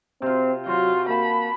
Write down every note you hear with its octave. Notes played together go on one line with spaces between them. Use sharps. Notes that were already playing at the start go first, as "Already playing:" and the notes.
C3 C4 F4
F#3 F4 F#4 C5
A#3 B4 A5 B5